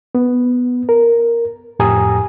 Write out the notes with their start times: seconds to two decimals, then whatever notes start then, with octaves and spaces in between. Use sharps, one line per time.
0.15 B3
0.89 A#4
1.79 F2 A2 G4 G#5 A#5 D#6